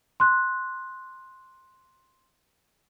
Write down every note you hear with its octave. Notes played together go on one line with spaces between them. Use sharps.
C6 F#6